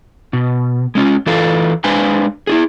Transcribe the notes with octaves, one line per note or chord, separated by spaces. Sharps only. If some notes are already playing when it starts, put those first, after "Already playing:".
B2
G#3 C#4 F4
E3 F4 A4 B4 F5
G#3 D4 B4 C5 F5 G#5
E4 F4 G#4